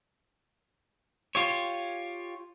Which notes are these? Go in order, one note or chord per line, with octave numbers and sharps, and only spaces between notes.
F4 G4 C#5